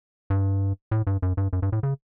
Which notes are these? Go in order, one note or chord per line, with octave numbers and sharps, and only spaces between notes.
G2
A2
G2
F#2
G2
F#2
G2
A2
C#3